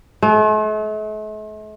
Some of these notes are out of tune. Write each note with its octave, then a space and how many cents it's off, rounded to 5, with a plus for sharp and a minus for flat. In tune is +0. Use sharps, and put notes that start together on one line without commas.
A3 -45